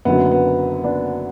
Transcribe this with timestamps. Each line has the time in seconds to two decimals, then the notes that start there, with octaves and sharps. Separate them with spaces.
0.05 F#1 F#2 D3 F#3 B3
0.31 B3
0.84 B3 D4